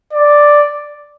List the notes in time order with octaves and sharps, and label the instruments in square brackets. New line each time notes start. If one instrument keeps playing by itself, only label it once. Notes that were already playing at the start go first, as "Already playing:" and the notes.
[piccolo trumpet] D5